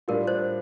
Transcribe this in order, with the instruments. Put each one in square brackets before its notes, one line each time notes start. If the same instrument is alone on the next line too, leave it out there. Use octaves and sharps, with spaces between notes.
[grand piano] A2 G3 D4 F4 [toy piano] A#4
[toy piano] C5